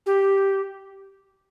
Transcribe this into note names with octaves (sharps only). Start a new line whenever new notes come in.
G4